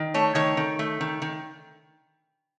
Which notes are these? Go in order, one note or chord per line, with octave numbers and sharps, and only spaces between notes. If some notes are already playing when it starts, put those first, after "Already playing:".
Already playing: D#3
A3 C#5
D#3 C#5
D#3
A3
D#3
D#3